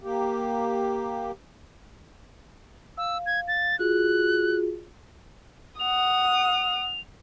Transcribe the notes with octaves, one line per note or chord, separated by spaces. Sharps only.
A#3 G4
F5 E6
G#6
A6
F4 F#4 G#4 F#6
F#5 D#6 F7